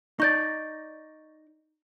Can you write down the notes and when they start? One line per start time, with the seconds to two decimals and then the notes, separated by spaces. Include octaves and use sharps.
0.20 D#4 D5 C#6 G6 A6